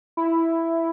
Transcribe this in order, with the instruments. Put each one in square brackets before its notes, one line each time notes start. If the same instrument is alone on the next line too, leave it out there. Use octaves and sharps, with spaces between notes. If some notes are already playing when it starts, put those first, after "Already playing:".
[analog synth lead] E4